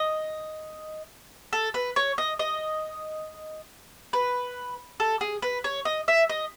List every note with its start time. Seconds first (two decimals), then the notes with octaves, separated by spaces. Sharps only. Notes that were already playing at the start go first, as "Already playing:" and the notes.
Already playing: D#5
1.53 A4
1.74 B4
1.96 C#5
2.18 D#5
2.39 D#5
4.13 B4
5.00 A4
5.21 G#4
5.42 B4
5.64 C#5
5.85 D#5
6.08 E5
6.30 D#5